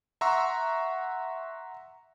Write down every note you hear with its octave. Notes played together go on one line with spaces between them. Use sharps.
E5 F#5 A#5 C6 C#6 E6